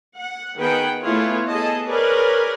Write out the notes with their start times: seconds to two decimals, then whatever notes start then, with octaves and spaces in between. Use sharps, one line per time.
0.16 F#5
0.57 D#3 B3 G#4 B4 F#5 G5
1.03 A3 B3 E4 F4 G#4 C#5
1.49 B3 G#4 A4 D#5 A5
1.85 G#4 A#4 B4 C#5 D5